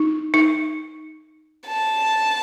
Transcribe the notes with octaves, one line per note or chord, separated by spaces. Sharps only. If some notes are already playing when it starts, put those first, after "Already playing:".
Already playing: D#4
D#4
A5